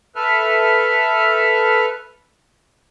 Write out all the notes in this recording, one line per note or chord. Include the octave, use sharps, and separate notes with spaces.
A4 B4 E5 F6